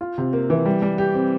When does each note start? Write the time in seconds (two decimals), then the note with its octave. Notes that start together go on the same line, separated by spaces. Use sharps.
0.01 F4
0.18 C3
0.33 A#3
0.50 E3
0.66 G3
0.82 G3
0.98 G4
1.14 C4